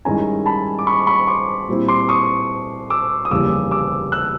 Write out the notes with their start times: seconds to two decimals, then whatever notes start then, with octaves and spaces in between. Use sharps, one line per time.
0.05 G2 D#3 G#3 C#4 E4 G#5 A#5
0.46 A5 B5
0.79 D6
0.87 B5 C#6
1.07 B5 C#6
1.27 C6 D6
1.68 A#2 G3 C4 E4
1.88 C6 D6
2.09 C#6 D#6
2.90 D6 E6
3.25 D#6
3.31 F1 D#2 C#3 E3 G3 D6 E6
3.71 D6 E6
4.12 E6 F#6